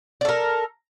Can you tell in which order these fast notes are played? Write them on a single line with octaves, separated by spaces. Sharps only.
D5 A4 A#4